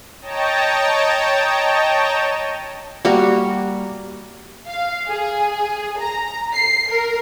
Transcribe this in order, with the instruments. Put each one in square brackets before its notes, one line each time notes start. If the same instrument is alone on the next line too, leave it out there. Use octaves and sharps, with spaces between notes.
[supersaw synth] C#5 D#5 G5 A5 A#5
[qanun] G3 A#3 F#4
[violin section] F5
G#4
A#5
C7
A#4